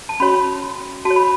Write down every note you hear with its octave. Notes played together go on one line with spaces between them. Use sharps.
A5
C#4 F#4 C#5 B5
F#4 A5
C#5
B5